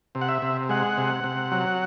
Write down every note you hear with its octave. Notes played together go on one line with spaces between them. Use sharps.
C3
F#5
E5
C3
G#3 F#5
C3
C3
F#3